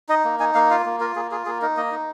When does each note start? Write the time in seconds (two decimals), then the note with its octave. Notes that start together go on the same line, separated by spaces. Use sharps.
0.09 D#4 D#5
0.24 A#3
0.40 D#4 G#5
0.55 A#3 F5
0.71 F4 F5
0.86 A#3
1.00 F4 A#4
1.16 A#3 G#4
1.31 F4 G#4
1.46 A#3 G#4
1.62 D#4 A#4
1.77 A#3 D#5
1.91 D#4